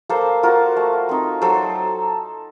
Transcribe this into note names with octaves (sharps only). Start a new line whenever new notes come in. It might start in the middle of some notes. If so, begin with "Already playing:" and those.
A#3 A4 C5
F4 F#4 A#4
A3
C4 D#4
F#3 A4 C5